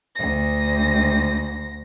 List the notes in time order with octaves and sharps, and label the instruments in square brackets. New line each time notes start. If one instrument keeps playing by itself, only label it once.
[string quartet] D2 A#6